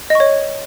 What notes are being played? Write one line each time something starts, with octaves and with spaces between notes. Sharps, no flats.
C#5 D#5 C#6